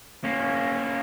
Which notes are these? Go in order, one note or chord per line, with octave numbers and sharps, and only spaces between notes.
A#3 C#4